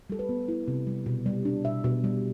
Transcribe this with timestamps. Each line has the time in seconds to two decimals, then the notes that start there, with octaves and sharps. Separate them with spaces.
0.10 G3 A4
0.19 B4
0.29 B3
0.48 E4
0.68 C3
0.87 G3
1.06 B2
1.26 G3
1.45 D4
1.65 B2 E5
1.84 B2
2.04 G3